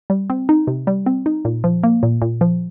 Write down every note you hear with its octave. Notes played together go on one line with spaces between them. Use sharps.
G3
C4
D#4
C3
G3
C4
D#4
A#2
F3
A#3
A#2
A#2
F3